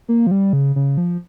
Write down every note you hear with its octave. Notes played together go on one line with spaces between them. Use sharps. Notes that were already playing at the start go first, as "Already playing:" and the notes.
A#3
F3
G3
C#3
C#3
F3